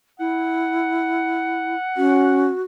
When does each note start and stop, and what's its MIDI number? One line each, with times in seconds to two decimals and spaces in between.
0.19 1.76 64
0.19 2.63 78
1.97 2.46 61
1.97 2.63 66